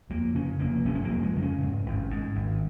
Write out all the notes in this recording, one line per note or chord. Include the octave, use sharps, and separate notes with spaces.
F2 A#3
C#3 C#4
F1 A#3
F1 C#4
C#4
A#3
F2
G#3
C#3
C#4
G#2
G#1
G#2
G#1